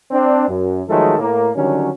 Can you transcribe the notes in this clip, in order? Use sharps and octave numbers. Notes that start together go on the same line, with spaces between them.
C4 D4
F#2
D#3 F3 F#3 G#3 A3 A4
A2 A#3
D3 D#3 F#3 G3 C#4